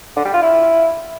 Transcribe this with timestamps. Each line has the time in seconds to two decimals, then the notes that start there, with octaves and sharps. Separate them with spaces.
0.16 D3
0.25 G3
0.34 F4
0.42 E4